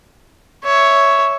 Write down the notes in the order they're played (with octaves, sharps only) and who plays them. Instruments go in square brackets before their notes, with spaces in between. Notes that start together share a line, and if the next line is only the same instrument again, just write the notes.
[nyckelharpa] C#5 E5